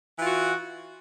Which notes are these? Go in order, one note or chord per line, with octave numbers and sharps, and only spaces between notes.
E3 F4 F#4